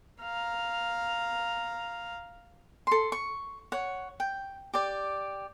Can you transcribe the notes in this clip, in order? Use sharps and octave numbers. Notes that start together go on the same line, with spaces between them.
F5 A#5
A4 C6
C#6
C#5 F#5
G5
G4 D5